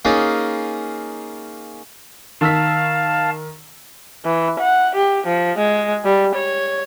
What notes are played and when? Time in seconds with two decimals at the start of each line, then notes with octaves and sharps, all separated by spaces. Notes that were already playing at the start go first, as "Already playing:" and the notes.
0.05 A#3 C#4 D#4 F4 G#4 D#5
2.41 D#3 F5 A5 E6 B6
4.25 E3
4.60 F#5
4.95 G4
5.26 F3
5.58 G#3
6.05 G3
6.35 C#5